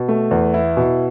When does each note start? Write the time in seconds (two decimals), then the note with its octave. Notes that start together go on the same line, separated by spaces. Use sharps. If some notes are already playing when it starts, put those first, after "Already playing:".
Already playing: B2
0.09 A3
0.31 E2
0.54 E4
0.77 B2